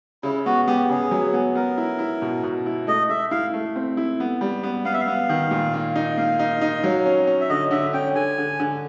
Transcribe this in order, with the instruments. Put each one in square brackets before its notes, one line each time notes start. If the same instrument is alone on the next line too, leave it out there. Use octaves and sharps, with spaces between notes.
[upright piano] C#3 [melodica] E4
[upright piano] B3 [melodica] F#4
[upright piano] B3 [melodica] G4
[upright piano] C#3 [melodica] G#4
[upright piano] F#3
B3
[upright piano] B3 [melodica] A#4
[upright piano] E4
E4
B2
B2
E4
[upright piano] A3 [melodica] D#5
[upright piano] A3 [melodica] E5
[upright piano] E4 [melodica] F5
[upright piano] A3
C4
E4
B3
G3
B3
[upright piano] B3 [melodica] F5
[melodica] E5
F5
[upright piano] B3
D#3
A#2
A#3
D#4
[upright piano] A#3 [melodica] F5
[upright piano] D#4
D#4
F#3
C#4
C#4
[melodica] E5
[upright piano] D3 [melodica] D#5
[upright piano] D3 [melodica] E5
[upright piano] C#4 [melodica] G5
[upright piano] D3 [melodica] G#5
[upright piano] D3
D3